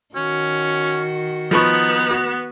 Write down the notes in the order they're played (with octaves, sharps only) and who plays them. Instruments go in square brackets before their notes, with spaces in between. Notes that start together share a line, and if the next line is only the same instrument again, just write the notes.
[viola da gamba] D#3 F#4 [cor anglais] C#4
[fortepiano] F3 B4 C#6 [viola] B3 [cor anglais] D#4
[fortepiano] F#4